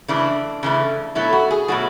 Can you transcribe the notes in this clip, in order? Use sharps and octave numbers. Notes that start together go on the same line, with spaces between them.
C#3 E3 A3 D4
C#3 E3 A3
B2 F#3 A3 E4
F#4
G#4
B2 F#3 A3 F#4